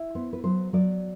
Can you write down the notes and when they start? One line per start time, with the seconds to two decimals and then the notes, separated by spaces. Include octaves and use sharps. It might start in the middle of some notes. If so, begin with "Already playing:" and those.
Already playing: E4
0.15 B3 C5
0.33 B4
0.44 F#3 C5
0.73 F#3 D5